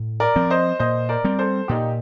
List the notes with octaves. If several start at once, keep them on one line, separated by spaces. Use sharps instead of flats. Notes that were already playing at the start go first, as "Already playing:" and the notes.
Already playing: A2
A#4 D5
F3 C4
C5 D#5
A#2 C5 D#5
A#4 D5
G3 C4
A4 C5
A#2 D#4 G4